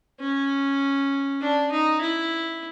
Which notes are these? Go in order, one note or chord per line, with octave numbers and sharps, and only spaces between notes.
C#4
D4
D#4
E4